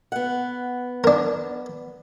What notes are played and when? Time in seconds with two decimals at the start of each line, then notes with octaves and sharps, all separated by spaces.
0.12 B3 F#5
1.04 D4 A#4